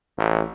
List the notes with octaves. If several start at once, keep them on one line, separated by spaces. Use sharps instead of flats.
A1